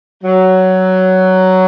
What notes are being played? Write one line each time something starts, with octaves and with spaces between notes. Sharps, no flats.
F#3